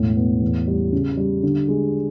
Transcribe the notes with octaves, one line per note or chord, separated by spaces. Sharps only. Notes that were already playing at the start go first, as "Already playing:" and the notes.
Already playing: E1 A2
B3
E2
G3
C#3
G3
D3
G#3